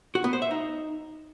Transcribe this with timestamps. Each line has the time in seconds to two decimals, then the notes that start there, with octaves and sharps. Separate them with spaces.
0.15 F#4
0.24 B3
0.33 C5
0.42 E5
0.51 D#4